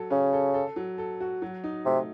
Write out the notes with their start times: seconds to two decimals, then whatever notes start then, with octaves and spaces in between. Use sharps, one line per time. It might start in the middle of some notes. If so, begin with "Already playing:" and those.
Already playing: F#3 A4
0.10 C#3 C#4
0.33 A4
0.54 A4
0.76 F#3
0.98 A4
1.21 F#4
1.42 F#3
1.64 D#4
1.86 C3 A3